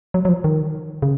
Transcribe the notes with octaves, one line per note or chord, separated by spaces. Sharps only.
F#3
F#3
F3
D#3
C#3